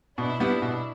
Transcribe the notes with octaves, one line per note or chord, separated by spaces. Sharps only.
B2 D4 E4
G3 B3
B2